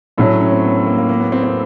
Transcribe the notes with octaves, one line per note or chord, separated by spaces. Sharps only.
A2 F#3 A3 D4
C#4
C#4
C4
B3
B3
A#3
A#3
A#3
B3
C4
C4